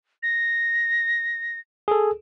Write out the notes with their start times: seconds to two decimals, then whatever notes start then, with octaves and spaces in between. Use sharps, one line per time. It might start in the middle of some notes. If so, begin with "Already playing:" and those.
0.23 A#6
1.88 G#4 A4